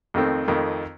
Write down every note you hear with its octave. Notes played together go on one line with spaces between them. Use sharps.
F2 D#3 A3 C4
F2 D#3 A3 C4